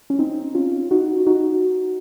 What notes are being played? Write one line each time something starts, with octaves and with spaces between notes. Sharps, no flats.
C#4
C4 D#4
C#4 F4
D#4 F#4
D#4 F#4